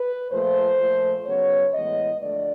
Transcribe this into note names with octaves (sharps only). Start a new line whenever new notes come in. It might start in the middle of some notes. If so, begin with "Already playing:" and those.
Already playing: B4
A#2 F3 A3 C5
A#2 F3 A3
C#3 F#3 B3 C#5
A2 E3 G#3 B3 D#5
D3 F3 A3 D5